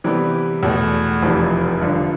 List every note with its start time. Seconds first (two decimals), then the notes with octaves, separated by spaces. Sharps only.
0.04 C3 E3 G3 B3
0.63 E2 B2 A3
1.22 F1 F2 E3 G3
1.81 G2 D3 F3